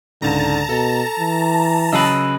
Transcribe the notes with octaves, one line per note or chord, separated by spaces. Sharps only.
C#2 G#2 D3 A5 A#5
B2 A4
E3
C#3 F#3 G#4 B4 D#5 E6